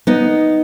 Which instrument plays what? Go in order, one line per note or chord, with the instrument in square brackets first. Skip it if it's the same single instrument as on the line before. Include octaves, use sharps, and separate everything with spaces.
[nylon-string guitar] B3 D#4